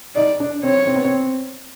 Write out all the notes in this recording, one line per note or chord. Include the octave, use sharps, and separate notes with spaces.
D#4 D5
D4
C4 C#5
C4
B3
C4